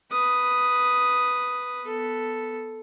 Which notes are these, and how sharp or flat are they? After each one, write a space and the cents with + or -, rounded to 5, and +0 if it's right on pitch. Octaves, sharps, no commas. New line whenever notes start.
B4 +0 D#6 +0
B3 +0 A4 +0